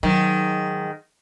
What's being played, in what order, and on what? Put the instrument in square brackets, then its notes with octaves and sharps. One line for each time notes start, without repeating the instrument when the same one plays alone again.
[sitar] G#2 D#3 [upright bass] F#3